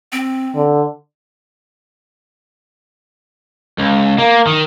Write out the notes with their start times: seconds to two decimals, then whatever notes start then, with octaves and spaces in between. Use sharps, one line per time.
0.12 C4
0.55 D3
3.79 C#2
4.18 A#3
4.47 D#3